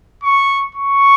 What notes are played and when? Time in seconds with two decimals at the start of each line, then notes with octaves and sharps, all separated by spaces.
0.24 C#6
0.75 C#6